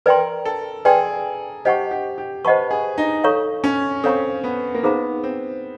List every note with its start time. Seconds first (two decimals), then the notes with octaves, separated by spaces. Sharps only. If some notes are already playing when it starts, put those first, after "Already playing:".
0.06 A#4 B4 D5 G5 C6
0.45 A4
0.85 G#4 B4 D5 G5 C6
1.65 G4 C5 D#5 F#5 A5 C#6
1.91 G4
2.18 G4
2.44 B4 C5 D#5 F#5 A5 C#6
2.71 G#4
2.98 D#4
3.24 A4 C#5 F5 A#5 C#6
3.64 C#4
4.04 C4 A4 C#5 F5 A#5 C#6
4.44 B3
4.75 A#3
4.83 B3 D#4 G#4 C5 F5 A#5
5.23 C4